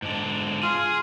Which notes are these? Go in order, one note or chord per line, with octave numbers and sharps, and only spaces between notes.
G#2 D3
F4 G#4